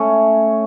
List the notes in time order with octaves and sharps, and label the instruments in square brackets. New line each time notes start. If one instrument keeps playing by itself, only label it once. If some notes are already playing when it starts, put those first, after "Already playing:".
Already playing: [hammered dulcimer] A3 C#4